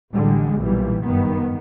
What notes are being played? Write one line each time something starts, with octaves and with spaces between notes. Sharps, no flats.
A1 D3 G3 G#3
B1 A#2 E3 G3
F#1 G2 D#3 B3